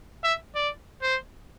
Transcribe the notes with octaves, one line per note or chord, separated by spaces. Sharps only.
E5
D5
C5